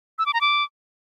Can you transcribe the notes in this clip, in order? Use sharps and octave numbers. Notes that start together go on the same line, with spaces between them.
E6
D6
A#5
D6